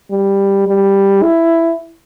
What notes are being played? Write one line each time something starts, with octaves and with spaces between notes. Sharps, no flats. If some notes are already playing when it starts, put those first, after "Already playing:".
G3
G3
E4